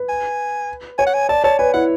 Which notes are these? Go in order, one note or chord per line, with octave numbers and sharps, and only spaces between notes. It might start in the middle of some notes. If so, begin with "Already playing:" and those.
Already playing: B4
G#5
C#5 G#5
F#5
G#5
D5 A5
C#5 A5
B4 G#5
E4 F#5